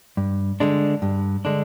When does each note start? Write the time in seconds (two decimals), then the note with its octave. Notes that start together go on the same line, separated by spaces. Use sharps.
0.17 G2
0.60 D3 G#3 D4
1.02 G2
1.45 D3 G#3 D4